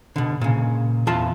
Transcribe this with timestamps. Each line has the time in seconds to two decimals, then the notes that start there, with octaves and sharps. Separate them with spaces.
0.16 B2 D3
0.41 A#2 C#3
1.07 E2 F4 F5 A5